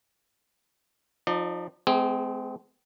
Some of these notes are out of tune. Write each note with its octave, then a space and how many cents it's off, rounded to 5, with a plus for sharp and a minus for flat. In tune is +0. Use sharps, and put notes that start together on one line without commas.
F3 +20 D#4 -10 D5 +35
G#3 +40 C4 -35 G#4 -10